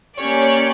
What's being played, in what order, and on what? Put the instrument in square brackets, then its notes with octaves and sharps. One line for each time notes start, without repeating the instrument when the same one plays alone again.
[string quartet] A#3 C#4 G4 D5 [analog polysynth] C#5
[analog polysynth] C#5